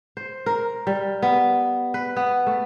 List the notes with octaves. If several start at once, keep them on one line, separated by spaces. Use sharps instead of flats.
C5
A#4
G3
B3
B4
B3
A3